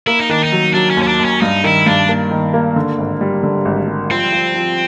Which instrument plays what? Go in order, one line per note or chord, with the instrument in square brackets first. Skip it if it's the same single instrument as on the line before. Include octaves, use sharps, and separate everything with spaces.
[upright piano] A#3 [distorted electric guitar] E4
[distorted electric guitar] D#4
[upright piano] D#3 [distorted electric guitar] D4
[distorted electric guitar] D#4
[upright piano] F#3
[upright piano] F#3 [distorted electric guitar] D4
[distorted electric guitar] C#4
[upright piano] D#2
[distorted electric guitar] C#4
D4
[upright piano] D#2
[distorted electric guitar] C#4
[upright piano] G2 [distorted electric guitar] D#4
[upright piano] D#3 [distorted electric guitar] E4
[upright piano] G2 [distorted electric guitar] D4
[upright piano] A#3
D#3
A#3
D3
G#1
G3
D3
G#1
G3
[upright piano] F3 [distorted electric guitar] C4
[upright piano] F3
F3